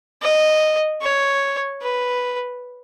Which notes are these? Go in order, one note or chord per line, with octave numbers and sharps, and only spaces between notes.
D#5
C#5
B4